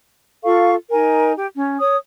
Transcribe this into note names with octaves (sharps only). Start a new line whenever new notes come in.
F4 A4 F5 C#6
D#4 A#4 G#5
G4
C#4
C#5 D#6